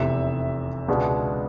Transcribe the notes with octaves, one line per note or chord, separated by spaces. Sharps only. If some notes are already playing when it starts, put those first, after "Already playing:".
Already playing: F1 E2 C3 E5
C#2 B2 G#3 B3 D4